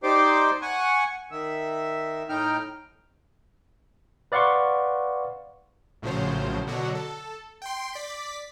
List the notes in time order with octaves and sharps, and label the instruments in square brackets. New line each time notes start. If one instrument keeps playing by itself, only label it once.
[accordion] D#4 G4 C5 D5 C6 D6
F#5 G#5 C#6
D#3 E5
A2 D#4 G5 F6
[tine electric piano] B4 D5 F5 F#5 C6 C#6
[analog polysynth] A#1 A2 C#3 F3 F#3 C5
B2 D3 F#3 F#4
A4
G5 C6
D5 B6